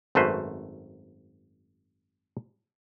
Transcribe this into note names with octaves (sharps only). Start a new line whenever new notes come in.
G#1 F#2 A3 F#4 B4 C5